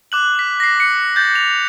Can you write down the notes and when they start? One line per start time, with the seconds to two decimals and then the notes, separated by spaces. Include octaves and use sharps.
0.12 D6 F#6 F#7
0.39 B6
0.60 A#6 C7
0.80 C#7
1.16 G6 A6
1.35 F7